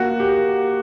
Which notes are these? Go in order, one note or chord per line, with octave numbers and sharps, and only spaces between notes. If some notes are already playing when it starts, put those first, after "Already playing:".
Already playing: A#3 F#4
G4